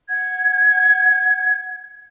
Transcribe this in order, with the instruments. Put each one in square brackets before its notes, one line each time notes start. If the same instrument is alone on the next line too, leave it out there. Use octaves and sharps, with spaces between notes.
[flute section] F#5 G#6